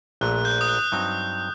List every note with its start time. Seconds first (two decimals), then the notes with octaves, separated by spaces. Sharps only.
0.21 A#1 A#2 A3 F#6
0.45 G6
0.61 D#6
0.69 F#6
0.92 G2 F#3 C4 D#4 D#6